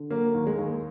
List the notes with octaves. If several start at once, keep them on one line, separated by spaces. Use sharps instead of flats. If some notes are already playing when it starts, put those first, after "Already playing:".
Already playing: D3
F#3 A#3
D#2
G#3
D#2